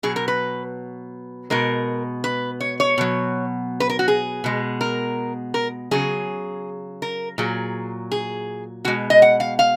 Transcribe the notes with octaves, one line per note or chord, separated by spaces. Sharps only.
B2 F#3 G#4
A#4
B4
B2 G#3 A#4
B4
C#5
C#5
B2 F#3
B4
A#4
F#4
G#4
B2 G#3
A#4
A#4
C#3 F#3 G#4
A#4
A#2 F#3 G#4
G#4
B2 G#3 F#4
D#5
F#5
F5
F5